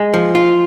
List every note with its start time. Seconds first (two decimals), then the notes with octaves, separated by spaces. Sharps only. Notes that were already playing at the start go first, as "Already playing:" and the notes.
Already playing: G#3
0.14 F3
0.35 F4